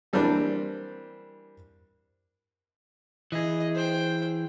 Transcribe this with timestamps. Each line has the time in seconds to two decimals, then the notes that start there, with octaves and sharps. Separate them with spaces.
0.13 E3 G3 A#3 C4 D4 C5
3.32 E3 G#4 D#5
3.75 C5 G5